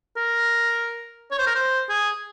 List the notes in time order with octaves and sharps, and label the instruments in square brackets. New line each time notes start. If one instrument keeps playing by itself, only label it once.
[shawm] A#4
C#5
C5
A#4
C5
G#4